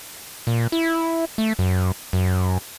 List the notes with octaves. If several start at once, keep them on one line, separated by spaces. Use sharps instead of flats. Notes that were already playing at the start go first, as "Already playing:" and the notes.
A#2
E4
A3
F#2
F#2